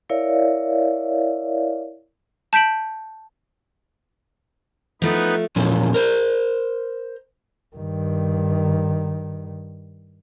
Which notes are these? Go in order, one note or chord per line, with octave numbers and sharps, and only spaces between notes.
E4 A#4 C#5 D5 E5 F5
A5 G6 B6 D7 F#7
F3 A3 B3 D#4 B4
E2 A#2 F3 C#4 A4
A#4 C5
G2 D#3